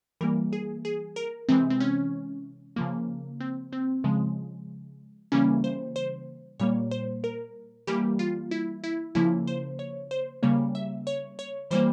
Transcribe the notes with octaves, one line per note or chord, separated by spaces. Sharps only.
E3 G3 A#3 A#4
G#4
G#4
A#4
C3 E3 G#3 C4
C4
C#4
C#3 F3 A#3
C4
C4
C#3 F3 G#3
C#3 E3 G3 A#3 C#4
C5
C5
A#2 G3 A#3 C#5
C5
A#4
E3 G3 A#3 G4
F4
E4
E4
C#3 F3 A#3 E4
C5
C#5
C5
C#3 G3 A#3 C#5
E5
C#5
C#5
E3 G3 A#3 C5